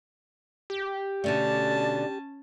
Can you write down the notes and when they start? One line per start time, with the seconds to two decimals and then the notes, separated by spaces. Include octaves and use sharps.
0.70 G4
1.24 B2 D3 A3 C#4 D5 A5